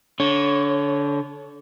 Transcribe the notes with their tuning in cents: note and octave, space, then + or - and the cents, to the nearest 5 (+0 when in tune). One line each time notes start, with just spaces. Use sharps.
D3 -25 C#5 +0